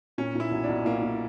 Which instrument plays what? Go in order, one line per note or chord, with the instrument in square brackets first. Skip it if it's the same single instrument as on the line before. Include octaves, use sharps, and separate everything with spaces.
[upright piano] A#2 [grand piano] C#4
[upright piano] A#2 [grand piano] E4
[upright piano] B1
[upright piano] B1 [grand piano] D4
[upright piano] A#2 [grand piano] A#3
[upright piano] A#2